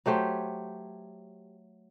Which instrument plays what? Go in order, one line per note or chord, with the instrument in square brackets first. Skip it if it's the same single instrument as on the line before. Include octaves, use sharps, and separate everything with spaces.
[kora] F#3 A3 G4 C5